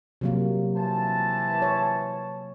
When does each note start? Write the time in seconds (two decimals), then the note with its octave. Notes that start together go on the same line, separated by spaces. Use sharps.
0.21 C3 F#3 A#3
0.76 E3 C5 A5
1.62 C#5